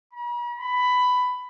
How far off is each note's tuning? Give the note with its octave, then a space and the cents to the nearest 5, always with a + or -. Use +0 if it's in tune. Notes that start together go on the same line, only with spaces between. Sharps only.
B5 -45
B5 +10